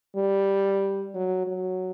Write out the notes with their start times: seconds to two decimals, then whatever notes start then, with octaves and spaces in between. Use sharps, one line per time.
0.16 G3
1.15 F#3
1.47 F#3